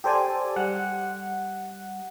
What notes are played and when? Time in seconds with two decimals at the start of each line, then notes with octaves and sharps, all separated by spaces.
0.04 G4 A4 C5 D5 G#5
0.56 G3 F#5